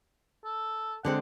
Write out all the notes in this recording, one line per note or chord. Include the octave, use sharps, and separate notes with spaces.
A4
D3 G#3 C4 F#5